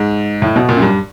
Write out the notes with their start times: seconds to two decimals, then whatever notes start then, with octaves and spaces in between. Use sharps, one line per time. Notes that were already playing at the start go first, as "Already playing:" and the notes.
Already playing: G#2
0.42 A2
0.56 B2
0.69 A#2
0.77 F#2
0.82 G2